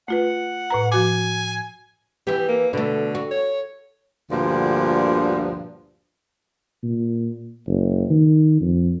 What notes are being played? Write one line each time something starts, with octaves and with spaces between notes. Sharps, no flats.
A3 F4 B4 F#5
A2 B4 A#5
F3 F#4 G#5 D6
E3 B3 G4
A#3
B2 D3 A3
F#4
C#5
D2 G2 A#2 D3 F3 D4
A#2
F#1
D#3
F2